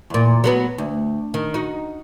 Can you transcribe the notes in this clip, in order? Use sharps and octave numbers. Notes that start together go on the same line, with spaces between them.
E2 A#2
F#3 A3 B3
D2
D#3
D#4 F#4